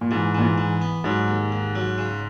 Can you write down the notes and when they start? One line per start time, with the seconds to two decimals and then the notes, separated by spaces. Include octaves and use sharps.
0.01 A#2
0.11 G#2 E3
0.35 A#2 E3
0.42 G#2
0.58 E3
0.81 B3
1.04 G#2 F#3
1.28 D#2
1.52 D#2
1.75 F#3
1.98 C#3